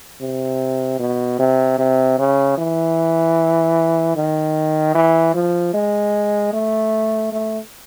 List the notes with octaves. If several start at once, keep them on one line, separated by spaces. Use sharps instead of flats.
C3
B2
C3
C3
C#3
E3
D#3
E3
F3
G#3
A3
A3